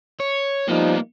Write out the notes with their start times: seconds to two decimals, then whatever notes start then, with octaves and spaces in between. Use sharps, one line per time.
0.20 C#5
0.68 F3 G3 A#3 B3 D#4